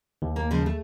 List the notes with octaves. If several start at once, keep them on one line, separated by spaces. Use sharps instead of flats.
D#2
A#3
C#3 F3 G#3
A3